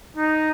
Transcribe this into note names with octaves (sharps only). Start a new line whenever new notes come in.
D#4